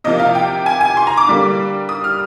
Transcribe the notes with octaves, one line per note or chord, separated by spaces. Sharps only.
C3 F3 A#3 D#5
F5
G5
G#5
G#5
C6
A#5
D6
D3 G3 A#3
D#6
F6